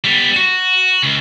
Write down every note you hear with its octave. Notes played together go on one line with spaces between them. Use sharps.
G3 B3
F#4
C#2